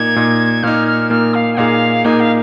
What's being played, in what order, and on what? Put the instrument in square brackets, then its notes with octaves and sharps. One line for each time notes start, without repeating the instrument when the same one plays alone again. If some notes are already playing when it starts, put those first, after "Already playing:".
Already playing: [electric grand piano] A#2 A#3 D#4 [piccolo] G#6
[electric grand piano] A#2 A#3 D#4
[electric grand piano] A#2 A#3 D#4 [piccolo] F6
[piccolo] F6
[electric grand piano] A#2 A#3 D#4 [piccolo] F6
[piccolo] F5
G#5
[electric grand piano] A#2 A#3 D#4 G#4 [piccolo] F5
[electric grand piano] A#2 A#3 D#4 G#4 [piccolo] G#5
[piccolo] F5